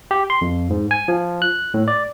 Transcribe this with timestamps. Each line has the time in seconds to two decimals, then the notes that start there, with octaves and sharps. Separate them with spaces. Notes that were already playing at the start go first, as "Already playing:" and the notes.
0.11 G4
0.30 C6
0.41 F2
0.70 G#2
0.91 G#5
1.08 F3
1.42 F#6
1.74 A2
1.88 D5